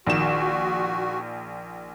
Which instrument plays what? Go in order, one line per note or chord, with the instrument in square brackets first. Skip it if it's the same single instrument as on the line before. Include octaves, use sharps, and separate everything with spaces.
[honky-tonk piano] A#1 D#3 E7 [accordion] F#4